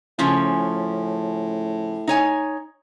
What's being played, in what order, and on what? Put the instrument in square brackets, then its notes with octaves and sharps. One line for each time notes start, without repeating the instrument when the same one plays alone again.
[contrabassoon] A2 [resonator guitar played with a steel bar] C#3 F3 C#4
[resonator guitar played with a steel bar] D#4 C#5 G#5